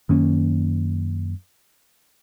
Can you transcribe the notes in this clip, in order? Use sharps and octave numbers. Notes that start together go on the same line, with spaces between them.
F#2 D#3 A#3 C#4